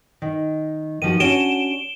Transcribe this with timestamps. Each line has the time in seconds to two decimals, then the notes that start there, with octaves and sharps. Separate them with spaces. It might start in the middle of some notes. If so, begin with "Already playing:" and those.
0.22 D#3
1.02 D#3 F3 F#4 D#7
1.20 C#4 D4 F#4 D7 E7 G7